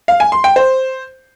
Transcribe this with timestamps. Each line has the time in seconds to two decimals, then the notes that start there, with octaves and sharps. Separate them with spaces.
0.08 F5
0.20 G#5
0.32 C6
0.44 G5
0.56 C5